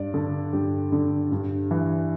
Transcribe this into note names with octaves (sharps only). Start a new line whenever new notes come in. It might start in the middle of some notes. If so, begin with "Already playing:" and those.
Already playing: G2 D5
D3 A4
G2 G4
D3
G2
E3